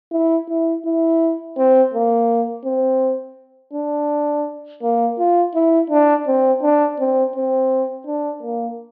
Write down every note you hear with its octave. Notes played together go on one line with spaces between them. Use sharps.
E4
E4
E4
C4
A#3
C4
D4
A#3
F4
E4
D4
C4
D4
C4
C4
D4
A#3